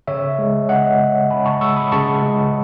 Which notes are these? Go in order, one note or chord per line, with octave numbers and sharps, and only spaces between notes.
C#3 C#5 E5
G#3
C#3 D#5 F#5
G#3
C#3 G#5 B5
A5 C#6
G#3 C#6 E6
B5 D#6
C#3 A5 C#6
G#3